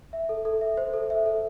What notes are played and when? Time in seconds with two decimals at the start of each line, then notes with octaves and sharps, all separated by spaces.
0.13 E5
0.29 A4
0.45 A4
0.61 E5
0.77 C5
0.94 A4
1.10 E5
1.26 A4